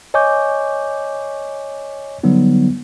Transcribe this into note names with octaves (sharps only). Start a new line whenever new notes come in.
C#5 D#5 G#5 C#6 D6 G6
D3 F#3 G3 B3 D#4